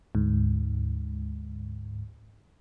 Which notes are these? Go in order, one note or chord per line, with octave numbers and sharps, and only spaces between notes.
D2 G#2